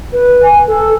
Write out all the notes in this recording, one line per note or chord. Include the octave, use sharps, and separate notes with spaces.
B4
G#5
A4